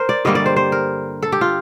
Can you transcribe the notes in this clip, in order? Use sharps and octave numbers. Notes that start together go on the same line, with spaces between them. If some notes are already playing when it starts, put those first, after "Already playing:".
Already playing: A#4 C5
D5
G2 D3 G3 A#3 D#5
D5
C5
C5
A#4
A4
G4
F4